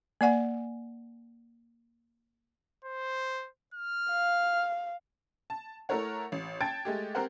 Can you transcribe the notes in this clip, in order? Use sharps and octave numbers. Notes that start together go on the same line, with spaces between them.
A#3 D5 F#5 G#5
C5
F6
F5
A5
A3 E4 A4 A#4 C#5 F#5
A1
G5 A5 G#6 A6 D7
G#3 A3 G4
C4 G4 A#4 C5 F#5